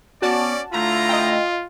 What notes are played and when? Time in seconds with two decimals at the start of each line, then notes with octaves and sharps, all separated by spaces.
0.22 B3 C#4 F#4 D5 A5
0.73 D3 A3 E4 F4 A#5
1.09 D#5 G5